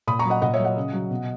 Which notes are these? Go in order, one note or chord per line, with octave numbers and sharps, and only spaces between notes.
A#2 B5 D#6
A#5 C#6
F#3
D#5 F#5
A#2 D#5 F#5
C#5 E5
F#3
D#5 F#5
C#3
F#3
B2